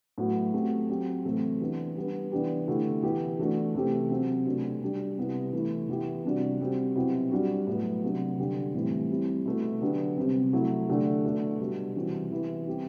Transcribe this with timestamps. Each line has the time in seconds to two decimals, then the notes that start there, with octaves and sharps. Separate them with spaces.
0.18 A2 F#3 B3 F#4
0.53 F#3 A3 C4 G4
0.89 F#3 C4 G4
1.25 A2 E3 A3 C4
1.61 E3 B3 D4 G4
1.96 G3 B3 D4
2.32 E3 B3 D4 G4
2.68 D3 A3 E4 G4
3.03 E3 B3 E4 G4
3.39 E3 A3 D4 F#4
3.75 C3 E3 A3 C4 G4
4.10 C3 F#3 C4
4.46 B2 A3 D4 F#4
4.82 G3 D4 G4
5.17 C3 G3 B3 E4
5.53 E3 A3 E4
5.89 E3 B3 E4 G4
6.24 C3 G3 D4 F#4
6.60 G3 C4 F#4
6.96 B2 F#3 C4 E4 G4
7.32 G3 D4 F#4
7.67 A2 F#3 B3
8.03 C3 F#3 B3 D4
8.38 D3 G3 D4 G4
8.74 A2 E3 G3 C4
9.10 G3 C4 E4 G4
9.46 B2 A3 E4
9.81 D3 F#3 B3 D4 G4
10.17 C3 G3 C4
10.53 F#3 A3 E4
10.89 D3 A3 D4 G4
11.25 B2 A3 D4
11.60 B2 G3 D4
11.96 C3 E3 G3 C4 F#4
12.31 E3 B3 E4 G4
12.67 G3 C4 E4 G4